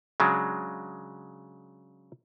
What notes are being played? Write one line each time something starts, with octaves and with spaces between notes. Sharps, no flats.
C#3 F#3 G#3 D4